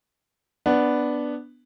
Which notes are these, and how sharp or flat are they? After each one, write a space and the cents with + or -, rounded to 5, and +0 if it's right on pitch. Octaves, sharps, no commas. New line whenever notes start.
B3 +0 D4 +0